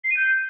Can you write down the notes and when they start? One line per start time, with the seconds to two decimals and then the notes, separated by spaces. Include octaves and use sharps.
0.04 C7
0.10 D#7
0.16 G6